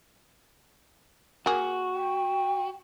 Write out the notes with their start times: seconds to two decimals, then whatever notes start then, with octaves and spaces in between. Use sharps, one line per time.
1.46 A#3 F#4 G#4
1.94 G5